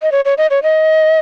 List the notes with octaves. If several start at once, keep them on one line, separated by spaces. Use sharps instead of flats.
D#5
C#5
C#5
D#5
C#5
D#5